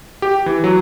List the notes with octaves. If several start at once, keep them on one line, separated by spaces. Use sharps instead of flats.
G4
E3
F#3